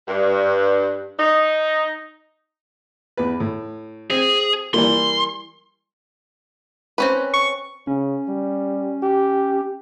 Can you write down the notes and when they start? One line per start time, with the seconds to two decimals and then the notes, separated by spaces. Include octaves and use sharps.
0.08 G2
1.19 D#4
3.17 E2 B4
3.40 A2
4.10 C4 G#4
4.74 E3 G3 A#3 C6
6.98 C4 C#4 B4
7.34 C#6
7.87 C#3 C#4
8.28 G3
9.03 G4